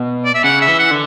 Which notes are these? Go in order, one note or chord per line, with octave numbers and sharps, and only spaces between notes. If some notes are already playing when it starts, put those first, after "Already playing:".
Already playing: B2
D5
E5
C#3 F#5
E5
E3
F#5
D3